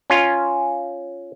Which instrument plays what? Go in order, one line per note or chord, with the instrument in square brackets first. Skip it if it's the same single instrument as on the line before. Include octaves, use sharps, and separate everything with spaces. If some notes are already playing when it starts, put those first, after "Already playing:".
[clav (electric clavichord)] C#4 F4